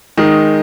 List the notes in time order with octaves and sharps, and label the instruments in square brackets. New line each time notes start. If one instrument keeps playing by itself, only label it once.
[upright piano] D#3 G#3 D#4